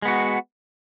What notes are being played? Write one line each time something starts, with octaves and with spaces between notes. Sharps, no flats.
G#3 B3 F#4